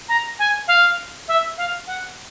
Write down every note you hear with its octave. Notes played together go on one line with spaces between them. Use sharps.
A#5
G#5
F5
E5
F5
F#5